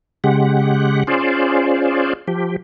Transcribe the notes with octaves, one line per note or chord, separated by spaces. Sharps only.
C#3 G#3 G4 F#5
C#4 F4 G#4 C5 D5
F3 G4